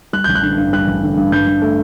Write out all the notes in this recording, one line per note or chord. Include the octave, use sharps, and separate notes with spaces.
G3 F#6
A1 G6
F#6
D3
G2
G3 F#6
A1
D3
G2
G2 G6
G2
A3